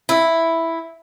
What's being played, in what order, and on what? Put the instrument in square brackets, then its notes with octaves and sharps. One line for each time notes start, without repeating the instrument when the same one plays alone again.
[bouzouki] E4